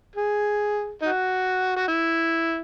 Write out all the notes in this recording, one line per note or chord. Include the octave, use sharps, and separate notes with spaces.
G#4
D#4 F#4
F#4
E4